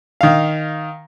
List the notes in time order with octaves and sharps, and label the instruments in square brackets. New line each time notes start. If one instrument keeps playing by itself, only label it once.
[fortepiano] D#3 F5